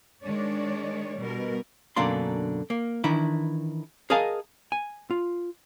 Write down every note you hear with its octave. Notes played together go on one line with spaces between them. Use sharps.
D#3 G#3 D4 C#5 D5
B2 G3 A#4
F#2 B2 D3 A#3 D4 C6
A#3
D#3 E3 D4 E4
G#4 A#4 D#5 F5 G#5 A5
G#5
F4